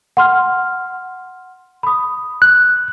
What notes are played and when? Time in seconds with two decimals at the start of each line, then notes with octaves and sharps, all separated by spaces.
0.17 F#5 C6 F6
1.83 B5 D#6
2.42 F#6